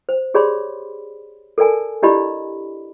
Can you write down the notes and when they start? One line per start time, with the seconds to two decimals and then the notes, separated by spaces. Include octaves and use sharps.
0.09 C5
0.34 G4 G#4 C#5 D5 B5 C6
1.58 A4 A#4 D5 G#5 A5
2.03 D4 E4 G4 D5 D#5 B5